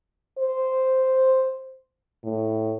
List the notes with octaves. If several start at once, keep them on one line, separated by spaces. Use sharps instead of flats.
C5
A2